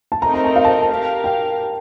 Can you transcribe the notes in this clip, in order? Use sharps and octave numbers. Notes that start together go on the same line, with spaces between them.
A5
A3 C4 D#4 A#4 D#5 A#5
A#5
A5
F5
A5
A5
G4 A#4 F5
G5